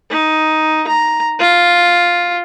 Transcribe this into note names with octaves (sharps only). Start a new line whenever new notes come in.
D#4
A#5
F4